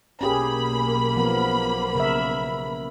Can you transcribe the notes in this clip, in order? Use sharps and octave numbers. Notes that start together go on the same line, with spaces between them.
B1 A#3 C#4 G4 G#4 B5
F3 B3 A#4
C#3 A#4 E5